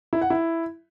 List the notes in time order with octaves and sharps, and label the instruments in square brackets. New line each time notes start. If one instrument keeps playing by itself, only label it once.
[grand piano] E4
F#5
E4